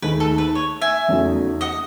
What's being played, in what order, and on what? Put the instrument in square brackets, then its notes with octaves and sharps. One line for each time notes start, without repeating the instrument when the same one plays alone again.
[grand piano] D#2 D#3 A3 D#4 G#4 [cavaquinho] B4
[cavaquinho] A4
B4
C#5
E5 G#5
[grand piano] E2 C#3 F#3 A3 D#4
[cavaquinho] D#5 F#5